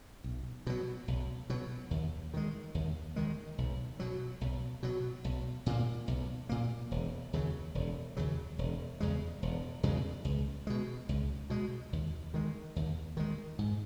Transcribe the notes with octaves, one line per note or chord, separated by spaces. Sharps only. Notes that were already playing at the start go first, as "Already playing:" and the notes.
B1
B2 F#3
B1
B2 F#3
D#2
D#3 G#3
D#2
D#3 G#3
B1
B2 F#3
B1
B2 F#3
B1
A#2 A#3
B1
A#2 A#3
E1
D#2 C#3 F#3
E1
D#2 C#3 F#3
E1
E2 C#3 G#3
E1
E2 C#3 G#3
C#2
B2 G#3
C#2
B2 G#3
D#2
D#3 G#3
D#2
D#3 G#3
G#2